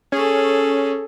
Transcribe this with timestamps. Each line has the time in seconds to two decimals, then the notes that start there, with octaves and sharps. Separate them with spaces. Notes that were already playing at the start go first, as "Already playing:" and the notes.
0.12 C#4 G#4 A4